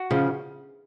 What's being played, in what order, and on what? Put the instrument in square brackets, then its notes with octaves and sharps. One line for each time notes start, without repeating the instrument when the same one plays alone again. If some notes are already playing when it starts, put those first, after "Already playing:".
Already playing: [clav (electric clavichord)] F#4
[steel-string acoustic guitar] C#3 [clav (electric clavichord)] F3